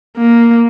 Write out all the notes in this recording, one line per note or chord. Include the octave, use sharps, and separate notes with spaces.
A#3